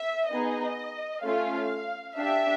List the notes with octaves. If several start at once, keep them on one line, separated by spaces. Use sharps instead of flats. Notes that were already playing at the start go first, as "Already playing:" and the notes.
Already playing: E5
B3 D#4 G#4 D#5
A3 C#4 F4 F5
D4 G4 E5